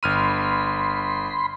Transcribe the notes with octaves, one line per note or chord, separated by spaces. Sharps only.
G1 B5 C6 F6 D#7